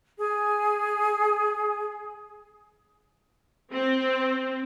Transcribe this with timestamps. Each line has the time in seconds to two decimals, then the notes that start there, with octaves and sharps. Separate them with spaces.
0.18 G#4 G#5
3.72 C4